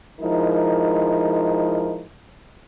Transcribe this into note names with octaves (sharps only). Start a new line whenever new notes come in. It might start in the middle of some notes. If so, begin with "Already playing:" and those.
F3 G#3 D#4 E4 A#4